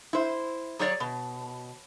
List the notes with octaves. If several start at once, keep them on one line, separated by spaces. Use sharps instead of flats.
E4 C5
F#3 G#4 C#5 D5
B2